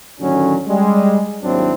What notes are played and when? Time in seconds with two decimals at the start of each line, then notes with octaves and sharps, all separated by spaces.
0.21 A1 D3 D#3 F#3 C#4
0.68 G3 G#3
1.43 G#1 D#2 F#3 C4 D4 E4